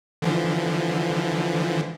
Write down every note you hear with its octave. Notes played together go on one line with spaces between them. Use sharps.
D3 E3 F3